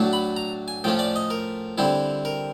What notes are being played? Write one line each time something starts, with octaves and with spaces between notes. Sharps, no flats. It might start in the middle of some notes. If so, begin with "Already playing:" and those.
Already playing: A2 F#3 A3 D4
B5
A#5
G#5
A2 F3 A3 C#4 G5
D5
D#5
A#4
D3 G3 C4 E4
A#4